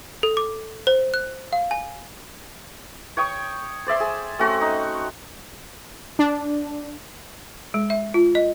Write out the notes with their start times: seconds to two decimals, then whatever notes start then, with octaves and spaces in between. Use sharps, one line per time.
0.23 A4
0.37 D6
0.87 C5
1.14 F#6
1.53 F5
1.71 G#5
3.17 C#5 G5 C#6 D#6
3.86 C5 D5 E5 C6
4.00 G#4
4.39 A3 C4 C#4 F#4
4.61 D#4
6.19 D4
7.74 G#3
7.90 E5
8.14 F4
8.35 D#5